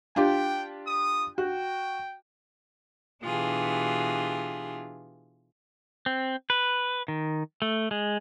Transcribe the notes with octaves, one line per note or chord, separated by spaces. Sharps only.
D4 F4 G4 G5
D#6
F#4 G5
B2 E3 D4 F4 G4 G#4
C4
B4
D#3
A3
G#3